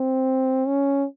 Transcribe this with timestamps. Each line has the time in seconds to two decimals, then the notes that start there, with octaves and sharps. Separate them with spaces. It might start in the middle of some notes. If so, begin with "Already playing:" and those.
Already playing: C4
0.67 C#4